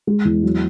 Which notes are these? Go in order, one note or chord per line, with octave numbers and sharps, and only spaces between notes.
G#3
E2
F#3